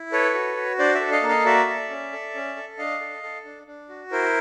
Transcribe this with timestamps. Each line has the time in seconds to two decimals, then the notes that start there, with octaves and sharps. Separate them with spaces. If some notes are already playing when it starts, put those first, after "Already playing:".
Already playing: E4
0.12 A4 B4 C#5
0.34 F#4
0.56 F#4
0.79 D4 C5 D5
0.95 D5 E5
1.00 A4
1.12 D#5 F5
1.23 A#3
1.29 D#5 F5
1.45 F#4 D5 E5
1.68 A4
1.90 C#4
2.12 A4
2.34 C#4
2.56 A4
2.78 D4 D#5 F5
3.01 A4
3.23 A4
3.45 D4
3.67 D4
3.89 F#4
4.11 E4 A#4 C5